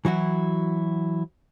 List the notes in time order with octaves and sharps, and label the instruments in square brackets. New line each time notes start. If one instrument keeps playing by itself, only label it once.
[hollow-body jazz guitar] E3 F#3 E4 F#4